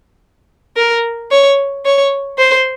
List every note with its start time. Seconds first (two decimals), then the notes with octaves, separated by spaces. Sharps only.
0.77 A#4
1.31 C#5
1.85 C#5
2.38 C5